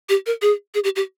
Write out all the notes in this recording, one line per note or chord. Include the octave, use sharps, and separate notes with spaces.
G4
A#4
G#4
G#4
G4
G4